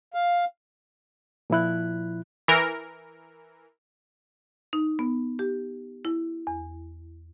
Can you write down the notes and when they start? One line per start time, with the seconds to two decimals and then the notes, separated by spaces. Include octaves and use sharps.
0.14 F5
1.50 A#2 F3 E4 F#6
2.48 E3 A#4
4.73 D#4
4.99 B3
5.39 G4
6.05 E4
6.47 E2